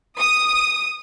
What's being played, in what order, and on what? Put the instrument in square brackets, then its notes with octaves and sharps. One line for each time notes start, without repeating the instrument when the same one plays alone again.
[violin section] D#6